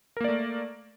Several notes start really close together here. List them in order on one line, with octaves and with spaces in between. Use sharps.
A#4 A#3 D5 A3